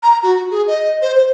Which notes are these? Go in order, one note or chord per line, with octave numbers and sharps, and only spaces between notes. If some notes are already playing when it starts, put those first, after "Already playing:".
A#5
F#4
G#4
D#5
C5
C5